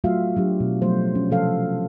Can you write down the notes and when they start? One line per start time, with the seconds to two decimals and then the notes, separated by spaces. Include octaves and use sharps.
0.04 F#3 A3 F4 F#4 E5 F5
0.36 F#3 D4 G4
0.60 B2
0.82 F3 F#3 A3 C5
1.15 C#4
1.30 C3 F3 A4 F5